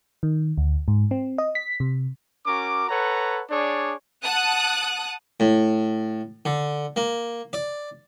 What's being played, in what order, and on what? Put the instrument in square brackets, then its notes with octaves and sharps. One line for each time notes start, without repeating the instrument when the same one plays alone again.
[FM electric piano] D#3
D2
G#2
C4
D#5
B6
C3
[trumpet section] C#4 F#4 A#4 D6
A4 B4 C#5 F#5 A#5
D4 G#4 C#5 D5
[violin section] F#5 A5 D#6 F#6
[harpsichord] A2
D3
A#3
D5